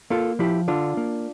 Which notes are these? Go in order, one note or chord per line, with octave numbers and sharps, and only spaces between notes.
A#3 F4 A4
F3 E4 G4
D3 D4 F4
A#3